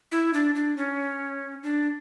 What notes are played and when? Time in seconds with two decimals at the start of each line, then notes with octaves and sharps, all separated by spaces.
0.12 E4
0.34 D4
0.55 D4
0.77 C#4
1.63 D4